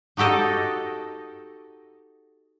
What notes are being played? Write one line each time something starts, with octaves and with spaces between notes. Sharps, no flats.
D#4 F#4 G4 A4 D#5